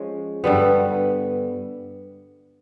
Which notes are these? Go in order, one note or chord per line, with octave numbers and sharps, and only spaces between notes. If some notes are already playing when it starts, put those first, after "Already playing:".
Already playing: F3 G#3 C#4
G2 D3 G3 B3